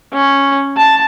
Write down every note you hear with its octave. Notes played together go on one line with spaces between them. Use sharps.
C#4
A5